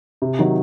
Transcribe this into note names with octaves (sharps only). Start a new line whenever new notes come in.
C3
D#3 F#3